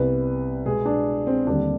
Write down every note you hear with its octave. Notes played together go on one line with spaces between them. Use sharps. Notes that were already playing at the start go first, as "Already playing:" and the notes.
Already playing: C2 C3 G3 B3 B4
B2 G#3 B3 G#4
D4
C4
D#2 D3 G3 C4 D4